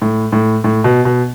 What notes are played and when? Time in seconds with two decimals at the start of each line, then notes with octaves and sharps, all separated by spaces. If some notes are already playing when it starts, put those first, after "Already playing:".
0.02 A2
0.32 A2
0.64 A2
0.84 B2
1.05 B2